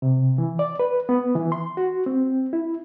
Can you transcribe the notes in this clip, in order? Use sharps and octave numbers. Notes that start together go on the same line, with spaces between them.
C3
E3
D5
B4
B3
E3
C6
F#4
C4
E4